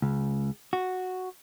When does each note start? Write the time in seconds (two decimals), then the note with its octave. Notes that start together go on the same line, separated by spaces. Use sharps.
0.02 C#2
0.73 F#4